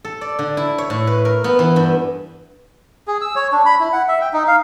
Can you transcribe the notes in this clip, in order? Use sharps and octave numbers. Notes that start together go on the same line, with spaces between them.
A4
D5
D3
E4
C#5
A2
B4
A#4
B3
E3
G2
G#4
E6
C#5
D4
B5
E4
F#5
E5
G5
D#4
F5